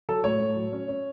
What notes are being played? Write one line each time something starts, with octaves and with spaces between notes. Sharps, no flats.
F#3 A4
A2 C#5
A2
F#3
C#4
C#4